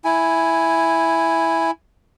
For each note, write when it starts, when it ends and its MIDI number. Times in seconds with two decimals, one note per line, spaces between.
0.05 1.71 64
0.05 1.71 80